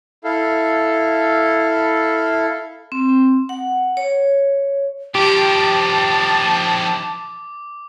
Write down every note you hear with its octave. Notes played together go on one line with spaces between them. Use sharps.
E4 A4 F5
C4
F#5
C#5
D#3 F3 G4 A5 D6